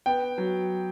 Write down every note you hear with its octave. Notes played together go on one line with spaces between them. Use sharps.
B3 G5
F#3